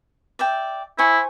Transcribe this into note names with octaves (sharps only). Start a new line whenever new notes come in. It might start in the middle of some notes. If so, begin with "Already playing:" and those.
D5 E5 G5
E4 C5 G#5 C#6